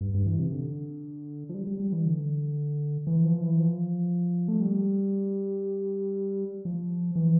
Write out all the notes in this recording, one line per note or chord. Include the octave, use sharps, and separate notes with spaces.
G2
G2
E3
C3
D3
F3
G3
G3
G3
E3
D3
E3
F3
E3
F3
A3
G3
F3
E3